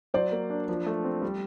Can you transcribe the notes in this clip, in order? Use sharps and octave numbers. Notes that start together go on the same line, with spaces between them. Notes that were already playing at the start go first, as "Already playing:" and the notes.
F#3 C5 D5
A#3
D4
F3
A3
C4
G3